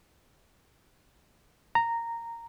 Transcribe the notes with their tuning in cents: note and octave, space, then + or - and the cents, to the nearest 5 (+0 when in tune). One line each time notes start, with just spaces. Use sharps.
A#5 -10